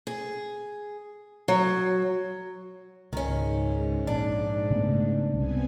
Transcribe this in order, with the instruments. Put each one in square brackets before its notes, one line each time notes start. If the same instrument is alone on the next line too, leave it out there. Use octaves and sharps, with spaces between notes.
[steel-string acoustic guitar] G#4
F#3
[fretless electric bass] C#2 [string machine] G#2 [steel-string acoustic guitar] D#3 C#4
[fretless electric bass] A#1 [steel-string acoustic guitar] D4
[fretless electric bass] C#3 A3 B3
[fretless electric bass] C2 [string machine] B3 C4 G#5